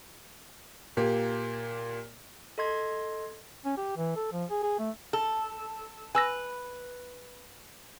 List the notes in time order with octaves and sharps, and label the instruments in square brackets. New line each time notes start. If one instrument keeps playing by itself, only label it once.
[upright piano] A#2 A#3 G4
[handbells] A4 D#5 C6 G#6
[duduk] C#4
G4
E3
A4
F3
G#4
G#4
A3
[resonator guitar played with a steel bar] A4
[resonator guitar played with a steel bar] B4 [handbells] G#5 E6 A#6